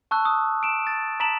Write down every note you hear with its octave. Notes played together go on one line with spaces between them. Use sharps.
A5 C#6 E6 F#6
D#6
D7 E7
A6
A5 A#5 B6 D7 E7 F#7